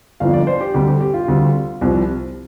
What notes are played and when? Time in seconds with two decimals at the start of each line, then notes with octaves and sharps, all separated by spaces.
0.20 G1 F2 F3 F5
0.34 D5
0.47 C5
0.61 G4
0.74 D2 C3 G3 G4
0.87 G4
1.01 G4
1.14 F4
1.28 D2 C3 G3
1.81 C2 C3 F3